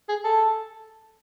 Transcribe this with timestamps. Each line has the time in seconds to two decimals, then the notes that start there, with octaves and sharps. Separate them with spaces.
0.09 G#4
0.25 A4